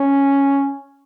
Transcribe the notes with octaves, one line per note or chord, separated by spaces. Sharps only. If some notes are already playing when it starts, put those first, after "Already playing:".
Already playing: C#4